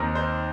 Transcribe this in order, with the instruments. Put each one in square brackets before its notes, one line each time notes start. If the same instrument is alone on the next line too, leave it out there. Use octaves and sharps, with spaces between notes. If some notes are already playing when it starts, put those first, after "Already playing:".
Already playing: [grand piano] D#2 D#3 C4 D#4 A#4
C5